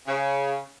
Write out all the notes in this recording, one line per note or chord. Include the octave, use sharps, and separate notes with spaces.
C#3